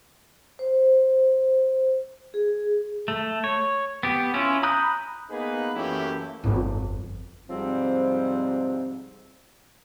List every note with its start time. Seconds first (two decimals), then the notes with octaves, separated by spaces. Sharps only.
0.59 C5
2.34 G#4
3.08 A3
3.44 C#5
4.03 B3 G4
4.34 C#4 E4 F4
4.63 A#5 B5 D#6 F#6 G6
5.30 A#3 B3 D#4 G#4 B4
5.75 F#2 E3 A3 A#3 E4 G4
6.44 G1 F2
7.49 G#2 C3 F3 G3 C4